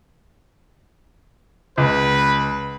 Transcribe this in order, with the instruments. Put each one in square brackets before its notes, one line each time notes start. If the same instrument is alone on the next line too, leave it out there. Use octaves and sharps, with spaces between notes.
[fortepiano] C#2 [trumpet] B4